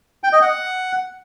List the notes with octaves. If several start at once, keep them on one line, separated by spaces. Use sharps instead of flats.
G5
D#5
F#5